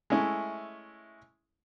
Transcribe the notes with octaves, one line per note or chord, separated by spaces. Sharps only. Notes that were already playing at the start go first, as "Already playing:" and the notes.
G#3 A3 C#4 E4